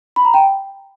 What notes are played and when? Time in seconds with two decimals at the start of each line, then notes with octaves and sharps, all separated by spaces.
0.16 B5
0.25 A#5
0.34 G5